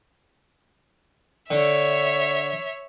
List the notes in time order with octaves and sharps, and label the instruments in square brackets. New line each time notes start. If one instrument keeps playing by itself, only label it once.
[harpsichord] D3 [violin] C#5 E5